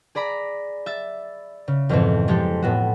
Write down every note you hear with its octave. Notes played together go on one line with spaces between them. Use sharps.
G#4 D5 A#5 B5
E5 A6
C#3
F2 G#2 B2 E3 A3 C4
F3 G#3 G4 A4
A2 B3 F#4